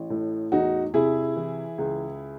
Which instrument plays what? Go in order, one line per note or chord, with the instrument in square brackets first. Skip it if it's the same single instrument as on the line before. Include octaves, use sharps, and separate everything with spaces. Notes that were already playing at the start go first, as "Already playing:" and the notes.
Already playing: [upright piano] A1
A2
E2 D#4 F#4
C3 E4 G#4
E3
C#2